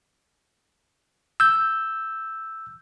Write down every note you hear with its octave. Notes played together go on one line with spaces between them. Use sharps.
E6 G6